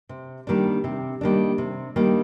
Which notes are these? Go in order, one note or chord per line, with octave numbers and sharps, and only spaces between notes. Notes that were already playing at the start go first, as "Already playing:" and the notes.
C3
D#3 G3 A#3 D4
C3
D#3 G3 A#3 D4
C3
D#3 G3 A#3 D4